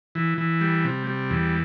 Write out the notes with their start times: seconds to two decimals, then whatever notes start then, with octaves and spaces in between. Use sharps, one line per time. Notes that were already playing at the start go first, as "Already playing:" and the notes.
0.15 E3
0.38 E3
0.61 G3
0.84 C3
1.07 G3
1.30 E2